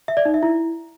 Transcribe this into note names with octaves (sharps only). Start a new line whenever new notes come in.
E5
D5
D#4
E5
E4